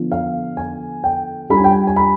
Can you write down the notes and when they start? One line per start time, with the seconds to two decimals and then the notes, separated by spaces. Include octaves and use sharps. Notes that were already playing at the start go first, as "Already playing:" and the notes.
Already playing: D3 F3 B3 D4 F4
0.12 F5
0.57 G#5
1.04 G5
1.50 G3 D4 F4 B5
1.57 G#5
1.64 G5
1.71 G#5
1.87 G#5
1.96 B5